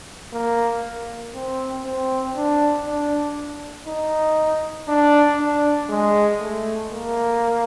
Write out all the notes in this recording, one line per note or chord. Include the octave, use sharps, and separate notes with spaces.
A#3
C4
C4
D4
D4
D#4
D4
D4
G#3
A3
A#3